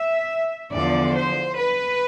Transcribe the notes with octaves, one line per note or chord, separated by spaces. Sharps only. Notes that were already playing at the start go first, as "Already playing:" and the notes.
Already playing: E5
E2 D3 F3 D5
C5
B4